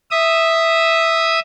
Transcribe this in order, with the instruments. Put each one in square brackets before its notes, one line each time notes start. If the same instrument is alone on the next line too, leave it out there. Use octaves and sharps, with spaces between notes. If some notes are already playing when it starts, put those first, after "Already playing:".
[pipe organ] E5 D#6